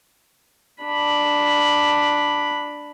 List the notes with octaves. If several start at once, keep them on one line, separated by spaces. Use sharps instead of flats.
D4 B5